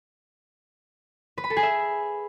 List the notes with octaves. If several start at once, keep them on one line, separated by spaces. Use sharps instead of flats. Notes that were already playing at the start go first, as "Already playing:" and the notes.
B4
B5
A4
G#4
E5